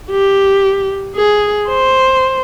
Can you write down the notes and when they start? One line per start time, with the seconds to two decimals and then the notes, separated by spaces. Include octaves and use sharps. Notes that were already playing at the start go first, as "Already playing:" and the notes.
0.11 G4
1.16 G#4
1.68 C5